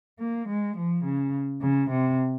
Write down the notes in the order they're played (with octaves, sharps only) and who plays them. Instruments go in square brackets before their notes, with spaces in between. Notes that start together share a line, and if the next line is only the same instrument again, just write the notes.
[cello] A#3
G#3
F3
C#3
C#3
C3